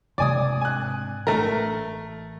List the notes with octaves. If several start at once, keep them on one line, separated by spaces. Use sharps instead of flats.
G#2 C3 D5 G#5 D#6
G#5 F#6
A1 A3 A#4